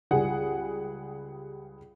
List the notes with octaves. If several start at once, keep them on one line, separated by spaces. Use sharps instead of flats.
C#2 G3 G#4 F#5